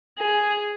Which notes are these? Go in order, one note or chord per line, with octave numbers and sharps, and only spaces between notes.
G#4